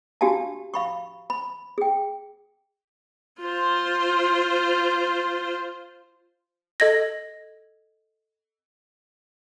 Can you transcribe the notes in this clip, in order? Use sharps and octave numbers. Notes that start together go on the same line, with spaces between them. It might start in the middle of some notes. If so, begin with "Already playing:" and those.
D4 F#4 G4 F5 G#5 A5
F5 B5 C#6
B5
G#4 G5
F4 C5
A4 D#5 G#6 A#6